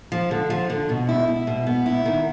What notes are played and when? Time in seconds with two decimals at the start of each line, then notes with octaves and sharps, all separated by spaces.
0.12 F3
0.31 D3
0.50 F3
0.70 D3
0.89 B2
1.09 E4
1.27 E4
1.47 B2
1.67 B3
1.86 E4
2.05 D#3